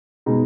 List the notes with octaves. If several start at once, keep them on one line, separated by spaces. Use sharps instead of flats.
B2 G#3 D#4